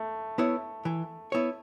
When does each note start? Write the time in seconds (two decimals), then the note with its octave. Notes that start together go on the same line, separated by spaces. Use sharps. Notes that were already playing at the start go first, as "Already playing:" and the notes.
Already playing: A3
0.38 B3 E4 C#5
0.85 E3
1.32 B3 E4 C#5